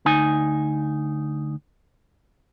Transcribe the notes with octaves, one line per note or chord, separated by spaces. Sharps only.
D2 D#4 G#5